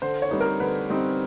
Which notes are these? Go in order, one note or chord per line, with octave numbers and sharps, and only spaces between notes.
D3 C5
C#5
G3 C4 D#4
A#4
D3 B4
G3 C4 D#4